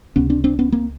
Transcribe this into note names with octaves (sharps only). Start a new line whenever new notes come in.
C#2 C3 B3 C#4
C4 D4
C4 D4
B3 C#4
A#3 C4